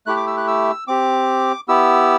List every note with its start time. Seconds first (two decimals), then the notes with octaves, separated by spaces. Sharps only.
0.06 A3 E4 G4 F#6
0.17 D6
0.27 E6
0.37 F#6
0.48 E6
0.88 C4 G4 D6
1.68 B3 E4 G4 E6